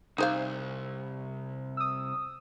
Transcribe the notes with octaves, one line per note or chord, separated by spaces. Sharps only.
C2 D#4 C5 F5
D#6 E6